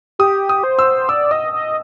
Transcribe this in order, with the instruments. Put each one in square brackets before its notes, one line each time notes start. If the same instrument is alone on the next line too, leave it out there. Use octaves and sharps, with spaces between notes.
[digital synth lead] G4 [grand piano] D#6
[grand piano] D#6
[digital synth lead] C5
[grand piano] E6
[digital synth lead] D5 [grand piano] E6
[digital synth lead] D#5 [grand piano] D#6
[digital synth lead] D#5